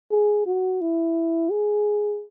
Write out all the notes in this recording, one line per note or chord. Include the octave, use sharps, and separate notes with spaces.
G#4
F#4
E4
G#4